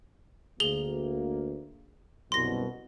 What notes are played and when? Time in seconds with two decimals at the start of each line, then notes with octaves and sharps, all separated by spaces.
0.60 D2 A#3 G#4 F7 G7
2.32 C2 F#2 B2 C6 A#6